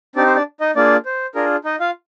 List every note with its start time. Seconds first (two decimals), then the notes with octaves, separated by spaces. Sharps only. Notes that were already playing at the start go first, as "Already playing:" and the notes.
0.16 C4 D4 D#4 G4 D5
0.26 C5
0.36 D4 D5
0.61 D#4 D#5
0.76 A#3 D4 F4 G#4 D5
1.06 C5
1.35 D4 F4 G#4 A#4
1.65 D#4 D#5
1.80 F4 F5